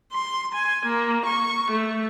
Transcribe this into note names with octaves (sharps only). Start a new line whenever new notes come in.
C6
G#5
A#3
C#6
A3